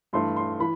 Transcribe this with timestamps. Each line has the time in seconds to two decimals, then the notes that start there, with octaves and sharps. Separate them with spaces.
0.13 G2 E3 A3 C6
0.36 C6
0.60 E3 B5